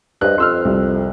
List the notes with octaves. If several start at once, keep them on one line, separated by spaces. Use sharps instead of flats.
G2 C5 D#5 F#6
F2 C6 E6 F6
C2